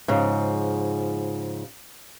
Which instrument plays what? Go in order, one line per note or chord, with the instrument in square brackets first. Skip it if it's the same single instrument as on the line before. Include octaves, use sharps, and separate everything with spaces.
[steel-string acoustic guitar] G#2 C#3 F3